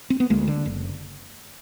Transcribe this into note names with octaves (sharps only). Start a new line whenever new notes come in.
C4
B3
D2 G#3 A#3
D3
F#1